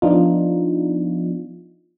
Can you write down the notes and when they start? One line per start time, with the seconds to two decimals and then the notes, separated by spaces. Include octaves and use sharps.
0.02 F3 B3 D4 D#4 F4